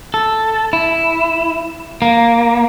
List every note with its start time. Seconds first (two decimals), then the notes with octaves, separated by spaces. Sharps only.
0.14 A4
0.73 E4
2.02 A#3